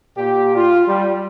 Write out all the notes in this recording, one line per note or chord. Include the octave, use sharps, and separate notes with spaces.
A#2 G4
F4
G3